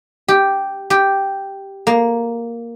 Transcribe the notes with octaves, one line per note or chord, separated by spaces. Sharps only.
G4
G4
A#3